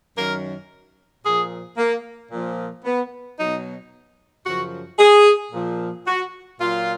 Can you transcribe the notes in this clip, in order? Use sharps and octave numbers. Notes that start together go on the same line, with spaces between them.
F#2 D#3 F#3 A#4
A#2 F3 G#4
A#3
A#2 F3
B3
F#3 D#4
B2
F#2 C#3 F3 F#4
G#4
A#2 F3
F#4
A#2 F#3 F4